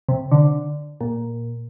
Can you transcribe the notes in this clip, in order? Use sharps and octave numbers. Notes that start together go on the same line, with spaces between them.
C3
D3
A#2